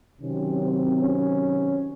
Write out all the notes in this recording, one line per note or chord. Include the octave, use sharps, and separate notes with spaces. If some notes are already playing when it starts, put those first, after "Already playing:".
C3 D#3 F#3 C4 C#4
C4
C#4